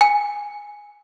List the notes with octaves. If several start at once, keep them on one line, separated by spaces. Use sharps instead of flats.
G#5